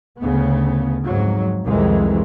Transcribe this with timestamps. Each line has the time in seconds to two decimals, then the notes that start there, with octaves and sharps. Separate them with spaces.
0.19 D2 C#3 B3
1.03 F2 G#2 F#3
1.66 C2 F2 D#3 E3 G#3